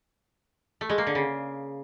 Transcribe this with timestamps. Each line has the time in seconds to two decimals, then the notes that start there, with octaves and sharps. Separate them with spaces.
0.81 A3
0.90 G#3
0.98 A#3
1.07 D3
1.15 C#3